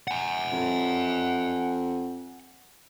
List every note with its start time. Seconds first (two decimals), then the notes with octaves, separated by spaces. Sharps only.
0.08 F#5 G#5
0.52 F2